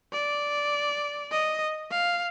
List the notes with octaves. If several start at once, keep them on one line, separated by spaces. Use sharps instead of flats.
D5
D#5
F5